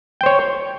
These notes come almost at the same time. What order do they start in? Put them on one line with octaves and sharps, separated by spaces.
G5 C5 C#5